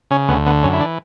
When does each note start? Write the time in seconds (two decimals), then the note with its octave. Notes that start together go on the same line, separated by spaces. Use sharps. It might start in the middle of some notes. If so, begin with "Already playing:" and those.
0.11 C#3 C#4
0.28 D2 B3
0.46 D3 B3
0.63 F#2 C#4
0.73 E4
0.80 E3 D4